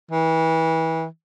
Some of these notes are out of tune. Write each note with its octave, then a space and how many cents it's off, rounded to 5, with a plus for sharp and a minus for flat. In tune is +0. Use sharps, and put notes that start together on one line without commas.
E3 -30